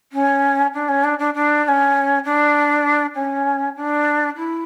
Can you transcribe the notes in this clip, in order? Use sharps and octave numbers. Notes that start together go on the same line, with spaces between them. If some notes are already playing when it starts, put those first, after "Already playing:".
C#4
D4
C#4
D4
D4
D4
D4
C#4
D4
C#4
D4
E4